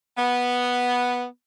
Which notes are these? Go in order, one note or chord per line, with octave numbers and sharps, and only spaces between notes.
B3